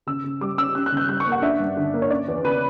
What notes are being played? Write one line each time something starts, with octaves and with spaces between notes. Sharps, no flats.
C#3 E6
C#3
G3 D6
C#4 E6
C#4 F#6
F#6
C#3 G6
G3 F#6
C#6
A#3
F#5
D4 E5
G2
D3
A#3
C#5
C#4 D5
E2
C#3 B4